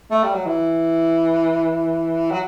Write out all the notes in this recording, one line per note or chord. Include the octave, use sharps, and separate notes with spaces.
A3
G3
F#3
E3
F#3